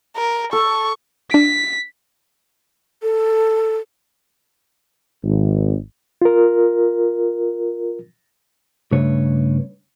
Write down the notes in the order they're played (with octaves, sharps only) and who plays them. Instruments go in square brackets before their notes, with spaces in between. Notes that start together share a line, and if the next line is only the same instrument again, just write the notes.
[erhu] A#4
[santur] A4 [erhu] C#6
[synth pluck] D4 D7 [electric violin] B6
[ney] A4
[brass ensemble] G#1
[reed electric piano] F4 A#4
[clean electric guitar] G2 C#3 A3 D4 B4 C#5